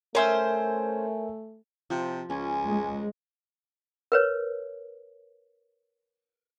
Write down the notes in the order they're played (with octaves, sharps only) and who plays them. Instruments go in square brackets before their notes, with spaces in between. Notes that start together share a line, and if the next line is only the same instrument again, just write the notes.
[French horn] A3 [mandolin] C#4 C5 [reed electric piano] A#4 E5 [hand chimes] C#5 G#5 E6
[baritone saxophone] C3 [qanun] F3
[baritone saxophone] C#2 [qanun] C#4 [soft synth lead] G#5
[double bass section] G#3
[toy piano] A#4 B4 C#5